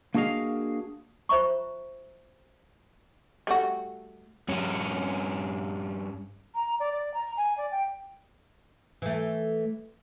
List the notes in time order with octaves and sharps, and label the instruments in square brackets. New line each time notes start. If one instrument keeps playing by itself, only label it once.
[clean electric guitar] A#3 D4 F#4 G#4 D#5 F5
[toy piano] F4 C5 E5 A#5 C#6
[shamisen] G3 A3 F#4
[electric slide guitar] G2 C#4
[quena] A#5
D5
D5
A#5
G#5
D5
G5
[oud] E3 A3